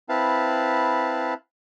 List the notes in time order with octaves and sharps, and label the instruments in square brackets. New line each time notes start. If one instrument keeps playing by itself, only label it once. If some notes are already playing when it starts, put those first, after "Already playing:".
[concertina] C4 E4 B4 F5 A5